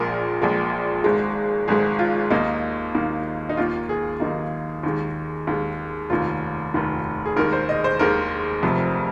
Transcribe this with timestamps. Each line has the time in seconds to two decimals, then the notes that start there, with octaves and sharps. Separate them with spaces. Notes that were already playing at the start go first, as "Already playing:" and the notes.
Already playing: A#1 A#2 G#3 A#4
0.42 A#1 A#2 G#3
1.04 G#1 G#2 G#3
1.68 G#1 G#2 G#3 G#4
1.99 F4
2.30 D#2 D#3 A#3 D#4
2.95 D#2 D#3 A#3
3.49 D#4
3.57 D#2 D#3 A#3 F4
3.89 G#4
4.20 D#2 D#3 A#3 D#4
4.83 D#2 D#3 G#3
5.47 D#2 D#3 G#3
6.10 F1 D#2 D#3 F4
6.74 F1 D#2 D#3
7.26 G#4
7.36 D#2 D#3 G#3 A#4
7.53 C5
7.69 D#5
7.84 C5
7.99 D#2 D#3 G#3 A#4
8.63 F1 F2 C3